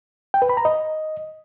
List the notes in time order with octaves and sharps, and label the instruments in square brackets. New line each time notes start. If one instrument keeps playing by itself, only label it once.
[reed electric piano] G5
B4
B5
A#5
D#5